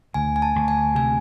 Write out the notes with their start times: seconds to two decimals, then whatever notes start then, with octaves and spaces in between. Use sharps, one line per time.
0.14 D2 G#5
0.36 G#5
0.42 A5
0.56 D2
0.68 G#5
0.95 C3 G#5